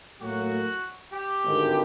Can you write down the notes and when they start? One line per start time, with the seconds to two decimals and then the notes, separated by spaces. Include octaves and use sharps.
0.22 A2 F#3 A#3 F#4
1.13 G4
1.44 G#1 G2 D3